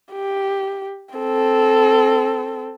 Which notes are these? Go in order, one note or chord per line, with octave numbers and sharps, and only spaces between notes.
G4
C4 A4